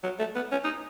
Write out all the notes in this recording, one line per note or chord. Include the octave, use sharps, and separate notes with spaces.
F#3
A3
B3
C#4
D#4